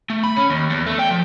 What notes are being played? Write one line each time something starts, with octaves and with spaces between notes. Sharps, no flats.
A3
B5
C#4
D#2
E2
A3
G5
F3